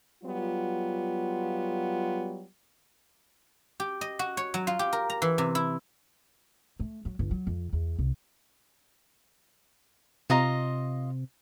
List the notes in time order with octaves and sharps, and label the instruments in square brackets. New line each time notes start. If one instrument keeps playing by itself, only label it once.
[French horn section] F#3 G3 B3 F4
[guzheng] G4
D#5
F#4
C#5
F#3
F4
G4
A#4
A#5
E3
C3
E4
[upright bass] A3
F#3
G1
F#3
F2
E2
C2
[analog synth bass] C3 [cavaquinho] F4 D#5 A#5